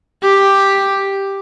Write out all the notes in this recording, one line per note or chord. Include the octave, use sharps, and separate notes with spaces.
G4